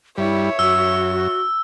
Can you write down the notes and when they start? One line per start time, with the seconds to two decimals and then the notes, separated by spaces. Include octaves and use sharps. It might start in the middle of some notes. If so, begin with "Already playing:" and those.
0.17 G2 G3 E4 C#5 E5
0.59 F#2 F#4 E6